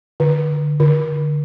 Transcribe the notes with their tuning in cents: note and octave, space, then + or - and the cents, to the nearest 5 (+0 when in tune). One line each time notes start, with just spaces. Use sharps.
D3 +15
D3 +5